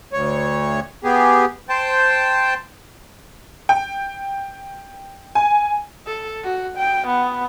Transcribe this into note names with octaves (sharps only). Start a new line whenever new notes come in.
D2 C#5
B3 G4 G#4
C5 G5 A5
G5
G#5
A4
F#4
G5
B3